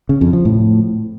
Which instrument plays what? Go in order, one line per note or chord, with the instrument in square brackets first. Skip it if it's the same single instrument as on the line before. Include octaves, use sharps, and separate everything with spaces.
[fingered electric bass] C#3
F2
F3
A2